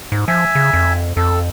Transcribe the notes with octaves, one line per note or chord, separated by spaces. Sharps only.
G#2
F3 E5 G#5
C#3
F2
F2 A4